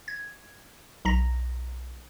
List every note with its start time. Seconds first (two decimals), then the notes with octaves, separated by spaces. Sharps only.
0.08 G#6
1.05 B1 A#5 A#6